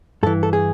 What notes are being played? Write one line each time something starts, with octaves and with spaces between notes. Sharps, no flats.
G2 E3 A4
A4
G#4